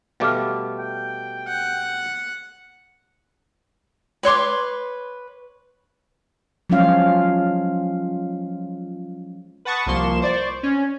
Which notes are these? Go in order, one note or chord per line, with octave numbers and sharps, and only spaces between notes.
B2 G3 A3 F5 D6 F6
G5
F#5
B4 C#5 C6 D6
F3 F#3 G#3 C#4 F4 F5
B4 F#5 A5 C#6 D#6
C2 F3 A#3 C6 C#6 E7
C5 D5 C#6
C#4